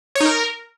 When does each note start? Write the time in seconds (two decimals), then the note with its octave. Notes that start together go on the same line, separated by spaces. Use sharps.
0.15 C#5
0.20 D#4
0.26 A#4